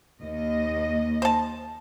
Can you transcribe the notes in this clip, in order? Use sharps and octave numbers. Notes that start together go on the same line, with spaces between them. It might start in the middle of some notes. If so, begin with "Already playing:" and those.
D#2 D#5
C5 A5